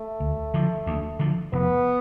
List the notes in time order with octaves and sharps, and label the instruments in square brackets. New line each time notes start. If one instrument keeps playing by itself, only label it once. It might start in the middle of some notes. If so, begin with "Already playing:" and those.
Already playing: [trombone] A3
[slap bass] D2
D3 F3
D2
D3 F3
[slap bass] F1 [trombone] B3